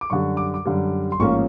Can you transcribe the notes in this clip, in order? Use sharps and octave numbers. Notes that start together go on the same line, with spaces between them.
D6
F#2 D3 G3 C#6
D6
D6
F#2 D3 G3
C6
A1 G#2 F3 A#3 C#4 C#6